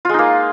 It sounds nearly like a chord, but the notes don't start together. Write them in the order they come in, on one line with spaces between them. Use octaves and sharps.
F4 G#3 D#4 A#3